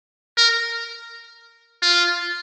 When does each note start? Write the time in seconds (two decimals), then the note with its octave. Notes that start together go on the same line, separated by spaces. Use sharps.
0.37 A#4
1.82 F4